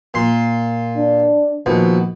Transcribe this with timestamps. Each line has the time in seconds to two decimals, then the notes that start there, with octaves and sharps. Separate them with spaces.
0.14 A#2 C6
0.97 D4
1.66 A#1 B2 D#3